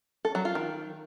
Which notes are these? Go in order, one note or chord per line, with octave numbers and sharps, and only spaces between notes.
A4
F#3
F4
D#3